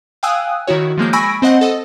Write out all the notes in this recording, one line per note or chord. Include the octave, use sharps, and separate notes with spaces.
F5 G5 G#5 D#6 E6 F#6
D#3 E4 F#4 C#5
F3 G#3 A#3 G6
G#5 B5 C#6 E6 A#6 D7
C4 C5 D#5 F#5
A4 D#5